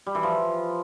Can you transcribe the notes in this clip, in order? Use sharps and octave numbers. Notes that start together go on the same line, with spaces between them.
G3
E3
F3